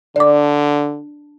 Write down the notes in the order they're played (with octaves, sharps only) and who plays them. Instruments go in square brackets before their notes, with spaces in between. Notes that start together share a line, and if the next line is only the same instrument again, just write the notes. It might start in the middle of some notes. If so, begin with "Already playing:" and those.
[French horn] D3 [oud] D4 [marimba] D5 D6